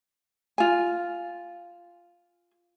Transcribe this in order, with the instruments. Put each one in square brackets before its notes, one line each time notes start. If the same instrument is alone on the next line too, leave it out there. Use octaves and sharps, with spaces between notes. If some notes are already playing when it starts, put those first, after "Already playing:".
[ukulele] F4 G#5